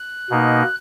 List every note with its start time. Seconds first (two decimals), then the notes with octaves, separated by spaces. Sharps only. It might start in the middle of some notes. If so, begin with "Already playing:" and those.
Already playing: F#6
0.30 B2 A#3 D#4